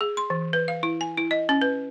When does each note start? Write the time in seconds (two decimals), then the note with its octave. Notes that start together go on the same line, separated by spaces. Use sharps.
0.01 G#4
0.17 C6
0.30 E3
0.53 B4
0.68 F5
0.83 E4
1.01 G#5
1.17 E4
1.31 D#5
1.49 C#4
1.62 B4